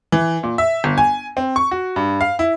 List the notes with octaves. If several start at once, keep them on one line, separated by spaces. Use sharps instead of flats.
E3
A#2
E5
G1
G#5
C4
C#6
F#4
G2
F5
E4